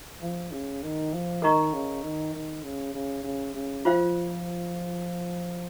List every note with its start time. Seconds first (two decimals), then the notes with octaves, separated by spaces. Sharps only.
0.21 F3
0.51 C#3
0.82 D#3
1.13 F3
1.42 D#3 A#4 D#5 A#5 C#6
1.73 C#3
2.03 D#3
2.34 D#3
2.63 C#3
2.94 C#3
3.24 C#3
3.54 C#3
3.85 F3 F4 C5 F5